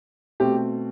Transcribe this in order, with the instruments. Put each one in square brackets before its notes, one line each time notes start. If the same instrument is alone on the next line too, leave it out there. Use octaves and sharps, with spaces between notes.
[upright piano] B2 A3 C4 G4